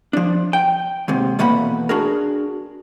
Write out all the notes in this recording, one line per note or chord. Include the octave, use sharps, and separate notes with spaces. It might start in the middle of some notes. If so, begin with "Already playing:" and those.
F3 D4
G5
D#2 G#2 C3
E2 B2 A3 A#3 F#5 B5
D4 F#4 G#4 A#4